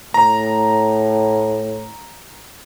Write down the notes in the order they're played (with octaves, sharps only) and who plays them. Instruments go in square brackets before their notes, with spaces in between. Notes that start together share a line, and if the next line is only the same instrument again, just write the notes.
[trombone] A2 [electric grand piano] A#5